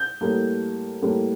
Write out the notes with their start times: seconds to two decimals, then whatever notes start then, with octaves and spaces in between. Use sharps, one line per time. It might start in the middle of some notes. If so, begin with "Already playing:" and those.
Already playing: G6
0.21 A2 G3 A#3
1.02 A2 G3 A#3